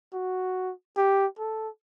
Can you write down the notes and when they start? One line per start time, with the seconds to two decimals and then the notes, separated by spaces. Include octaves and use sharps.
0.13 F#4
0.97 G4
1.39 A4